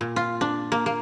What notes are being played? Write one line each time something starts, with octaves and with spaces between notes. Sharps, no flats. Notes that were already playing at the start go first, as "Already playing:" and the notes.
A#2
F4
D4
A#3
A#3